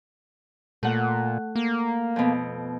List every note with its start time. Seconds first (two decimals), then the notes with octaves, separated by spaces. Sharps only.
0.83 A#2 A3 F#5
1.55 A#3
2.16 F2 B2